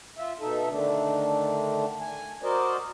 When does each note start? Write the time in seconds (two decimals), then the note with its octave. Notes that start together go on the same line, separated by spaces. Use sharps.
0.18 F4 E5
0.40 B2 D#4 A4 E5
0.69 D3 D#3 A3 D4
2.00 G#5
2.43 F#4 A#4 C5 D5 D#5